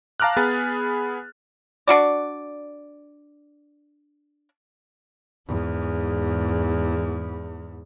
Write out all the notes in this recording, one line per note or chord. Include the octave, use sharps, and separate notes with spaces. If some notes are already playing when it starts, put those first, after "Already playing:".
F5 A5 A#5 D6 F6 F#6
B3 G#4 B5 A6
D4 F#4 D5
E2 G#2